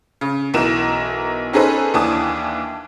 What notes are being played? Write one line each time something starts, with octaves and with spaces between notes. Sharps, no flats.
C#3
B1 E3 A#4 E7
C#4 D#4 G#4 A4 B4 C5
D#2 E3 D4 G#5 A5 D#6